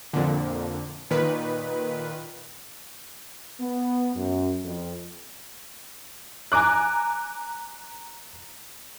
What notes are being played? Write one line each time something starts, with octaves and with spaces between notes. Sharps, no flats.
F2 A#2 D3
A#2 D#3 B4
B3
F#2
F2
G#5 A#5 D6 F#6